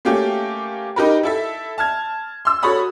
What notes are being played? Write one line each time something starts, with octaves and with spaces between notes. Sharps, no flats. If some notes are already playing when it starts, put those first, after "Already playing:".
A3 A#3 C#4 G4
D#4 G4 A#4 B4
E4 A4 E5
A5 F6 G#6
C6 E6
F#4 A4 C#5 B5 D#6